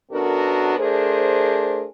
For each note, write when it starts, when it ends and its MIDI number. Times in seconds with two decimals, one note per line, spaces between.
0.11 0.76 42
0.11 0.76 59
0.11 0.76 62
0.11 0.76 66
0.11 0.76 69
0.11 0.76 70
0.77 1.86 57
0.77 1.86 62
0.77 1.86 68
0.77 1.86 70
0.77 1.86 72